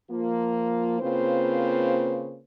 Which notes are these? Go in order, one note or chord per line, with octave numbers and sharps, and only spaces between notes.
F3 A#3 F4
C#3 A#3 C4 F4 B4 C5